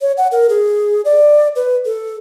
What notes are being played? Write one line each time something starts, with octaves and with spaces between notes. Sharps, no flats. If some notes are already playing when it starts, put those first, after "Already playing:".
C#5
F#5
A#4
G#4
D5
B4
A4